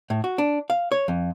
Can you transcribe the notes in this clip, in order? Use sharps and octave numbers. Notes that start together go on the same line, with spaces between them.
A2
F#4
D4
F5
C#5
F2